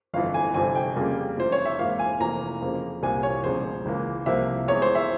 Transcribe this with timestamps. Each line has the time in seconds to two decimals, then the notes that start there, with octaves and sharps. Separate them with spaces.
0.13 G1 F2 E3 F5
0.34 G#5
0.54 G1 F2 C3 F3 G#5
0.75 G5
0.96 F2 C#3 G3 A#3
1.38 F1 F2 C3 E3 C5
1.52 C#5
1.65 E5
1.79 G#1 G#2 E3 A#3 F5
1.99 G#5
2.20 F1 F2 E3 A#3 A#5
2.61 F2 C#3 F3 A#3
3.02 C2 A#2 G3 A#3 G#5
3.23 C#5
3.43 E1 E2 C#3 F3 C5
3.85 C#2 C#3 E3 A#3
4.26 C2 C3 F3 A#3 E5
4.68 E2 E3 G#3 C#5
4.82 C5
4.95 E5